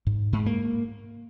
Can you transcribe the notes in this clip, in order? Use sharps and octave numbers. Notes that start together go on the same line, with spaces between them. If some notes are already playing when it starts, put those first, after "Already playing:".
G#2
G#2
A#3